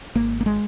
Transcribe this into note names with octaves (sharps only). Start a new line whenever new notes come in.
G#1 A#3
A#3
G#3